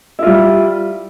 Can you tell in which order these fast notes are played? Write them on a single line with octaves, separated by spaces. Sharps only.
E4 F4 G3